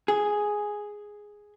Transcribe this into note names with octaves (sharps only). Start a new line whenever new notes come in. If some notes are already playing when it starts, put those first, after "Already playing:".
G#4